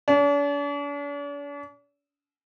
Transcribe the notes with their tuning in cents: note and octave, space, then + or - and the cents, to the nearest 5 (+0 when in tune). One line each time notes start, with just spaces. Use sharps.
D4 -45